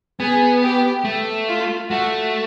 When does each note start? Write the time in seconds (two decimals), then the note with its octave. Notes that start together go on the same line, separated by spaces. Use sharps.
0.20 B3 G#4
0.62 G4
1.05 A3
1.48 F4
1.90 A3 F#4